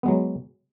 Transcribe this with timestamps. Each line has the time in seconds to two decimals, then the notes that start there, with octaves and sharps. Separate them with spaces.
0.03 B3
0.06 G#3
0.08 F#3